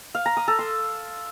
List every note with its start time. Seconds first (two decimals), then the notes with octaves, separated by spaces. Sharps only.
0.15 F5
0.26 A#5
0.37 D#6
0.48 A4
0.59 C6